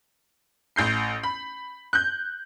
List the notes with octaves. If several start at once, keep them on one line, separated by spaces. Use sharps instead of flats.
A1 G6 C7
B5
F#6 G6